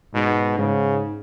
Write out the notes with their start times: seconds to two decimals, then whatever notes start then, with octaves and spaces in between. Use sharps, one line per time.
0.14 G#2 B2
0.59 G#2 C#3